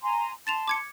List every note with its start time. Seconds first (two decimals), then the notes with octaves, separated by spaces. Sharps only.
0.03 G#5 A#5 C6
0.47 A5 C6 A6 E7 F7
0.68 D6 G#6 C#7